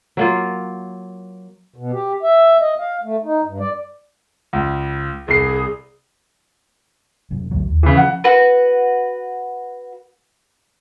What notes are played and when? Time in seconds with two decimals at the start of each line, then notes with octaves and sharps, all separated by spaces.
0.17 F#3 A#3 F4
1.76 B2
1.92 G4
2.23 E5
2.60 D#5
2.79 F5
3.04 A3
3.24 D#4
3.45 G2
3.60 D5
4.53 C#2
5.28 C2 G#4 C7
7.31 F1 F#2
7.51 A1 D2 F#3
7.69 D#2
7.83 C#3 E3
7.97 F3 F#5
8.24 F#4 B4